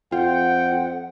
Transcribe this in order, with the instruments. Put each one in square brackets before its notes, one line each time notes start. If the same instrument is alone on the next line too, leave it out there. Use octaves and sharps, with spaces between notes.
[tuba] F2 [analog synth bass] F4 [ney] F#5 [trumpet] G5